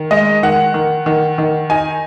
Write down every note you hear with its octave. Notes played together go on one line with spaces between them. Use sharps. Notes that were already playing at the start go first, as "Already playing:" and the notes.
Already playing: D#3
G#3 D#5
D#3 F#5
D#3
D#3
D#3
D#4 G#5